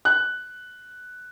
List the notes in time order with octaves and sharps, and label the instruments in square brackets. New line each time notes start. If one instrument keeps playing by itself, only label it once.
[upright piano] F#6